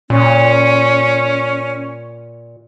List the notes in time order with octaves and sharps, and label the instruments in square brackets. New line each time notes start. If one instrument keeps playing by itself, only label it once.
[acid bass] A#2 [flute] C#4